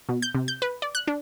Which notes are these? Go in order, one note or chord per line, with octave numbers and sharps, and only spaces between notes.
B2
G6
C3
G6
B4
D5
F#6
D4